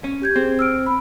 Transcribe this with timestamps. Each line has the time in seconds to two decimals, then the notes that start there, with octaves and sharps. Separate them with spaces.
0.04 C#4
0.22 G4 G6 G#6
0.36 C4 G#4
0.59 E6 F6 D7
0.86 B5